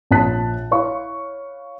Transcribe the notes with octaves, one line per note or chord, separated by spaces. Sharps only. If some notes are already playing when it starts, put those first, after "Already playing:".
A#1 C#5 A5 F#6 B6
E4 C#5 F5 C#6